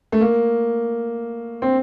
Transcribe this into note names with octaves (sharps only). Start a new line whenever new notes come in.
A3
A#3
C4